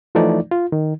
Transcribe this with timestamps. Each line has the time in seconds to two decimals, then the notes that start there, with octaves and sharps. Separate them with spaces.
0.15 E3 F3 A3 D#4 D5
0.51 F4
0.72 D#3